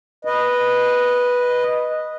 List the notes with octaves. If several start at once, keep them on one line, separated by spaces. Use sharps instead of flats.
B4 D#5